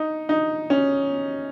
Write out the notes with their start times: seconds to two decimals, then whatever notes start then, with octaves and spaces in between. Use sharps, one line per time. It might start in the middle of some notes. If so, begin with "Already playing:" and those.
Already playing: D#4
0.29 D#4
0.70 C#4